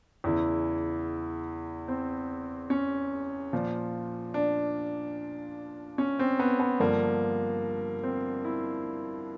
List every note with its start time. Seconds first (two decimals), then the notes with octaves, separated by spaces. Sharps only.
0.24 E2 C#3 E3 E4
1.88 C4
2.70 C#4
3.53 A#2 F3
4.34 D4
5.98 C#4
6.19 C4
6.39 B3
6.60 B3
6.80 G2 D3 F3 A#3
8.03 C4
8.44 E4